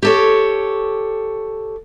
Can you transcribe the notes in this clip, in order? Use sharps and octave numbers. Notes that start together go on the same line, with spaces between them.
G4 A4 C#5